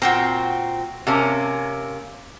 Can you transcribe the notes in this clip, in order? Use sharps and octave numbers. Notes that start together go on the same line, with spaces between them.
A#2 C4 F#4 G5 A#5
C3 A#3 C#4